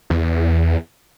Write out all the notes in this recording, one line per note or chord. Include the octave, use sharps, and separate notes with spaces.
E2